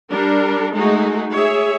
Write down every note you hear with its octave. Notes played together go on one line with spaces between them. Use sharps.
G3 D4 A#4
G#3 A3 D#4 F#4 G#4
G#4 C#5 E5